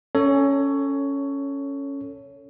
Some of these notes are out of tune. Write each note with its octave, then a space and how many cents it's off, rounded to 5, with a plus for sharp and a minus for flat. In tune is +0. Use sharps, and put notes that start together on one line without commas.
C#4 +0 A4 +20 C#5 +15